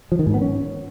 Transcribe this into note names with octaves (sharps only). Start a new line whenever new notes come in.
F3
D#3
G#2
B3
C#4